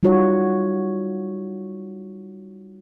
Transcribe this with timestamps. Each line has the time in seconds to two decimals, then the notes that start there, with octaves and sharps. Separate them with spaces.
0.03 G3 D#4 F4 F#4 C#5